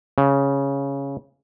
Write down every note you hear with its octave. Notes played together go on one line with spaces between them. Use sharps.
C#3